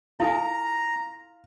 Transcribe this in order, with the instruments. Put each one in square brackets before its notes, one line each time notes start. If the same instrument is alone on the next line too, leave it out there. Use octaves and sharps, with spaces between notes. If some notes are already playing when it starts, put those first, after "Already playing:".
[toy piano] E4 A4 G#5 [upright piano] F4 [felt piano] F5 [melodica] A#5